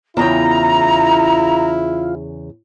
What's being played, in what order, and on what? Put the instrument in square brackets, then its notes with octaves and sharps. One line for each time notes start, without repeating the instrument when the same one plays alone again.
[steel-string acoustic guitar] E2 C#3 G5 [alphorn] E4 [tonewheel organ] F4 [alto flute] A#5